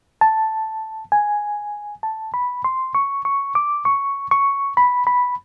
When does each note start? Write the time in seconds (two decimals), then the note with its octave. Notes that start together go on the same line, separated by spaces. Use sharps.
0.21 A5
1.12 G#5
2.03 A5
2.34 B5
2.64 C6
2.95 C#6
3.25 C#6
3.55 D6
3.85 C#6
4.31 C#6
4.77 B5
5.07 B5